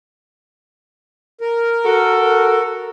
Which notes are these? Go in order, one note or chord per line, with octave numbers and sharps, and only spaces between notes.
A#4
F#4 A4